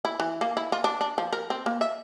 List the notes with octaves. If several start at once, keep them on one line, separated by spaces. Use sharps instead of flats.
E4
E3
A#3
E4
F4
D4
D4
F3
A#4
C4
A#3
E5